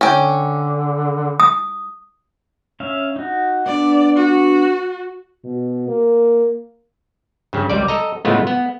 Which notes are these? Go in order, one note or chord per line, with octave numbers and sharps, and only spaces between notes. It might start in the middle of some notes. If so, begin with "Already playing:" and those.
D3 C#4 G5
D#6
C#4 E5 F5
D#4 F#4
B3 D4 D5
F#4
B2
A#3
G2 C#3
C#2 G3 D5
A4 D#5 A#5
A2 C#3 G#3 A3 B3 F4
B3